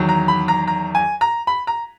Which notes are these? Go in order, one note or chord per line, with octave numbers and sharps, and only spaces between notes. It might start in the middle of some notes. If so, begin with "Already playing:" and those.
Already playing: E2 D#3 F#3
A#5
B5
A#5
A#5
G#5
A#5
B5
A#5